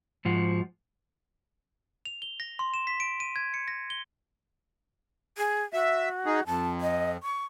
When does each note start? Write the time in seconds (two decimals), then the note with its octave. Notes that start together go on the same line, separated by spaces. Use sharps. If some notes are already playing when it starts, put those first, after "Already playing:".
0.25 G#2 F3 F#4
2.05 F7
2.22 G7
2.40 A#6
2.59 C6
2.74 E7
2.87 B6
3.00 D7
3.20 D#7
3.36 G#6
3.54 C#7
3.68 A#6
3.90 G7
5.38 G#4
5.73 F#4 E5
6.26 D#4 G#4
6.46 F2 A5
6.81 D#5
7.23 C#6